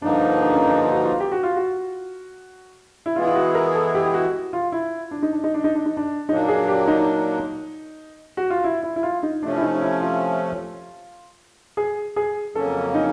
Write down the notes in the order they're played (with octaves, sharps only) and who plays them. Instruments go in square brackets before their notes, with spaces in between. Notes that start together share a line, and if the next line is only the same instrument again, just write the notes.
[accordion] G2 D3 F3 A#3 D#4 [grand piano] D4
[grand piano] D4
C#4
D4
F4
F#4
F4
G4
F#4
F4
F#4
E4
[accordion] E3 G#3 B3 E4 G#4 [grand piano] F4
[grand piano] F4
F#4
A#4
A4
G4
G4
F#4
F4
E4
D4
D#4
D4
D#4
D4
D#4
D4
D#4
D4
[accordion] A#2 F#3 A#3 D4 [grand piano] D#4
[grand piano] G#4
G4
D#4
F#4
F4
E4
E4
E4
F4
D#4
[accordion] C3 F3 A3 C#4 [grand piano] D4
[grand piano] E4
D#4
E4
F4
G#4
G#4
[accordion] F2 C#3 F#3 A#3 C#4 [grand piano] A4
[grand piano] D#4